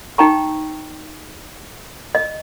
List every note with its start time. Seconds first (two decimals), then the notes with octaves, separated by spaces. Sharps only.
0.18 D#4 G5 A#5 C#6
2.15 D#5